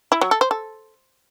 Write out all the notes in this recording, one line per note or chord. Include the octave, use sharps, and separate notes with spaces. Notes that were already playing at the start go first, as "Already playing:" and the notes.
E4
F#3
A4
C5
A4